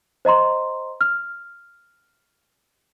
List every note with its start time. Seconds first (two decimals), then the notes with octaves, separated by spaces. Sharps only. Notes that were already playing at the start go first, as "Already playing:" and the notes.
0.25 C5 D#5 A#5 C6
1.01 F6